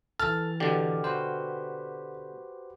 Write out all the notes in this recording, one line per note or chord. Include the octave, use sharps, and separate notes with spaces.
E3 A4 F6 A6
B2 D3 G4
F#4 B4 C5